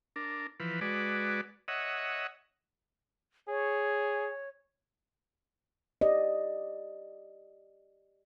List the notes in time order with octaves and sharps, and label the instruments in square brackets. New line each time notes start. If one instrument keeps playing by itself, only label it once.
[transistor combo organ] D4 A#4
E3 F3 B4
G#3 F#4 B4 D5
C#5 D#5 E5 F#5
[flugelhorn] G#4 [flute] C#5
[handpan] G4 D5 D#5